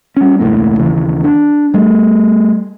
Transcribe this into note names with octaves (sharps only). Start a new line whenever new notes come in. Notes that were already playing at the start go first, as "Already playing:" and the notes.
G3 C#4
E1 C#2 A2 A#3
D#2 C#3 E3
D4
G3 A3